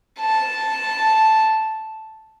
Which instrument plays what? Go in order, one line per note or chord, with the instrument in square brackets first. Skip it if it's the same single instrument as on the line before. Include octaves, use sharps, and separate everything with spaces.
[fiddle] A5